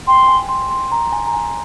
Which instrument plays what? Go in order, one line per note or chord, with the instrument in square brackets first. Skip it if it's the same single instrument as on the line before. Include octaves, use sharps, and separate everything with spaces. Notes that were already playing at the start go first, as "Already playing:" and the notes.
[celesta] G5 [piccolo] C6
[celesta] G#5
C6
C6
A#5
G#5
A#5
G#5